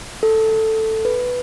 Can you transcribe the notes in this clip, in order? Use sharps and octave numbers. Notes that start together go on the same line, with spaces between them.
A4
B4